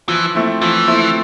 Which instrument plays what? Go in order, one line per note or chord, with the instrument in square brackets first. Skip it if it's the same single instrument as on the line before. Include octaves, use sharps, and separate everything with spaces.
[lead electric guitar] E3 [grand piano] F3
[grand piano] A3 C4 E4
[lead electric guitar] E3 [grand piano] F3
[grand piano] A3 C4 E4